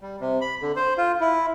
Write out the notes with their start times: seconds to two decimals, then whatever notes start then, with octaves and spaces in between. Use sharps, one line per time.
0.01 G3
0.20 C3
0.41 B5
0.62 D3
0.76 C5
0.98 F4
1.21 E4